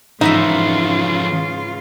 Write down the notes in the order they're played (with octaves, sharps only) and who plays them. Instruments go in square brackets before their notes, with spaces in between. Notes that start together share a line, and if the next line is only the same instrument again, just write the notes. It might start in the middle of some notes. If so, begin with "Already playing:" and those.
[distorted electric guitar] F2 F#4 [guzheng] G#2 E3 E5 [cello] C#3 F4 [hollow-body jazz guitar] D#4